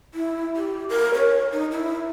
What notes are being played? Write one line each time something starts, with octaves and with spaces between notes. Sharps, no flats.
E4
G4
A#4
C#5
D#4
E4